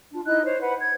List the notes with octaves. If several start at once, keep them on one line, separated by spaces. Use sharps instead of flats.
D4 F4
D#4 E4 D#5 F#6
C5 C#5
B4 F#5 B5
G#6